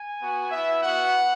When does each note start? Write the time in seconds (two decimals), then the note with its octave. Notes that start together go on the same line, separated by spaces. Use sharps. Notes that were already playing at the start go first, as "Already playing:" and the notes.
Already playing: G#5
0.21 B3 F#4
0.51 B3 E4 E5
0.83 B3 F#4 F#5